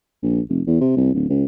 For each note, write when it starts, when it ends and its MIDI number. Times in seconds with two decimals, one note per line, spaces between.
0.22 0.40 34
0.49 0.61 29
0.66 0.78 40
0.81 0.93 48
0.96 1.10 36
1.14 1.28 26
1.29 1.45 37